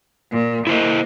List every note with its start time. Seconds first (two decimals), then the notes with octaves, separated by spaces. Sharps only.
0.31 A#2
0.67 A#3 E4 C5 D#5